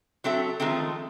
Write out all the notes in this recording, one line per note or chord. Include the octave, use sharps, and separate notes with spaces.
F#3 C4 A4 E5
D#3 F3 G#3 A3 C4